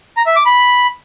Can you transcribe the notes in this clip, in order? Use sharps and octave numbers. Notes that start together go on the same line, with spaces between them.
A#5
E5
D6
B5